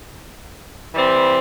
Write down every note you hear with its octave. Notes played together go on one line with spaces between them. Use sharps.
E3 G3 C4